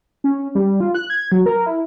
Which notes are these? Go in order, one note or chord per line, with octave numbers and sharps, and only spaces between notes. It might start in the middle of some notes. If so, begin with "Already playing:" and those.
C#4
G3
F4
F#6
G#6
F#3
A#4
E4